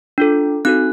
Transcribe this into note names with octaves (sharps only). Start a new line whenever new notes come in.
D4 F4 A4
C4 D#4 F#4 A4 F#6